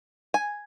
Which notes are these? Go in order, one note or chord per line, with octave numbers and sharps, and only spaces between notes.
G#5